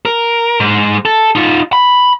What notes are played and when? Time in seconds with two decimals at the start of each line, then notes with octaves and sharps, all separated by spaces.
0.05 A#4
0.60 G#2 G#3
1.05 A4
1.35 D#4 F4
1.73 B5